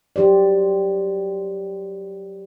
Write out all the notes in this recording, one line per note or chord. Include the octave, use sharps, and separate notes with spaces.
F#3 G4 C5 D5